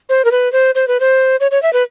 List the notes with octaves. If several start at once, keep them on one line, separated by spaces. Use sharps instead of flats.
C5
A#4
B4
C5
C5
B4
C5
C#5
C#5
E5
B4